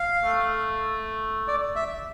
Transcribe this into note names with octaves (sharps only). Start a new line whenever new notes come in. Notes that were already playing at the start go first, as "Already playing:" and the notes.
Already playing: F5
A3
D5
E5